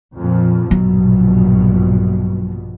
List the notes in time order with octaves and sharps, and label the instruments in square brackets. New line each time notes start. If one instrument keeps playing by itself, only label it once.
[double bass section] F2 A#2 F3
[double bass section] A#1 G2 B2 [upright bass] F#3